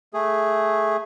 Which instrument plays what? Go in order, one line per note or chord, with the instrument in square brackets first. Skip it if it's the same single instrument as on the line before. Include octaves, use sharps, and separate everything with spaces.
[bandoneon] A3 G#4